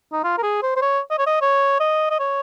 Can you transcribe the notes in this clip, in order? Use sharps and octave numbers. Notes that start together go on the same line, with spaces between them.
D#4
F4
A#4
G#4
C5
C5
C#5
D#5
C#5
D#5
C#5
D#5
D#5
C#5